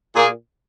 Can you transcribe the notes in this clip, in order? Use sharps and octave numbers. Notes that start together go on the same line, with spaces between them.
A#2 A#3 G#4